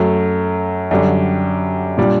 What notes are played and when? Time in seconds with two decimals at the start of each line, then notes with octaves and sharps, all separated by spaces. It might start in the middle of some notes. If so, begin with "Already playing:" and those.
Already playing: F#2 F#3 A3
0.91 F#2 D3 G3
1.98 A#2 G3 D4